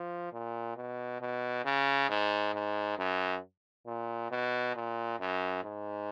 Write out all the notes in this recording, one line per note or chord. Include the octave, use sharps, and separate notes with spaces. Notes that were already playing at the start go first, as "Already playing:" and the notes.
Already playing: F3
A#2
B2
B2
C#3
G#2
G#2
F#2
A#2
B2
A#2
F#2
G#2